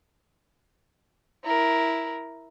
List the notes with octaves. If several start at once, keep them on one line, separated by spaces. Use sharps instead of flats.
E4 A#4